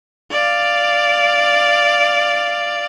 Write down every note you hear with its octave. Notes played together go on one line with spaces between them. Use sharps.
D5 F5